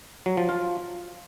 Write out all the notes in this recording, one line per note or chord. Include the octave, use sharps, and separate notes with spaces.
F#3
F3
F4